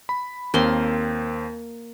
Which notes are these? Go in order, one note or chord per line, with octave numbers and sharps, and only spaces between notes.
B5
D#2 A#3 C4 C6